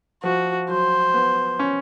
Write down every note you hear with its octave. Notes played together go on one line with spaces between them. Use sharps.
F3 F#4
F#3 C5
B3
C#4